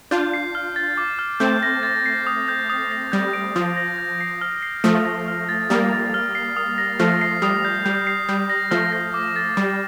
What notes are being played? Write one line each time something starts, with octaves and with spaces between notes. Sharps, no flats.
D4 F4 G6
C7
F6
A6
D6
F6
A3 C4 G6
A#6
A6
C7
D#6
G6
D#6
A#6
G3 G6
D7
F3 D#6
A#6
G6
C7
F6
C7
F3 A3 D#6
A#6
F6
A6
G3 A#3 D#6
A6
F6
C7
D#6
A#6
F3 A3 F6
C7
G3 D#6
G6
G3 G6
C7
G3 G6
A#6
F3 A3 F6
A#6
D6
A6
G3 D6